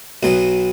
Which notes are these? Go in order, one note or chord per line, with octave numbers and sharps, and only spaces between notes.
B1 B2 F#3 B3